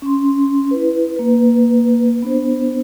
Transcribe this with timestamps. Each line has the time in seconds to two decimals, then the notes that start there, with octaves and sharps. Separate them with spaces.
0.02 C#4 C6
0.71 E4 B4
1.16 A#3 B4
2.22 B3 D4 C5